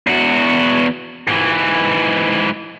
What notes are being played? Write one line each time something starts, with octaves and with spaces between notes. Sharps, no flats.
E2 F#4
G#2 E3